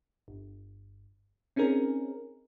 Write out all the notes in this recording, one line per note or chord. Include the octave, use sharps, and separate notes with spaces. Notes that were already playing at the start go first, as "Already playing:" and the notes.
G1
C4 C#4 D#4 G#4 A#4